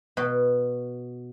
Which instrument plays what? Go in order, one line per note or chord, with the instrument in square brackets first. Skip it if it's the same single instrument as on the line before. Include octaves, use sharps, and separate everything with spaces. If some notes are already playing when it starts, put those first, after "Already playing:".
[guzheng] B2